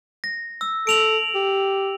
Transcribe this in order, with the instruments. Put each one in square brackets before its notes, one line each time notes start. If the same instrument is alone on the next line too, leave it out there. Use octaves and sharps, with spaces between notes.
[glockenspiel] A#6
E6
[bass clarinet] A4 [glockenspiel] D7 F7 F#7
[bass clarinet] G4